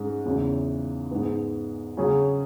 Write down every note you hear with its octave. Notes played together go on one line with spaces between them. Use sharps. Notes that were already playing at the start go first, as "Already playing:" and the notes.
Already playing: G#2 G#3 C#4
E2 C#3 F#3 C#4 E4
G#2 G#3 B3
C#3 F#3 C#4 G#4